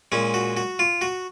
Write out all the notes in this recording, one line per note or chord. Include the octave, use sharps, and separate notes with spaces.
A#2 G#3 C#4
F#4
F#4
F4
F#4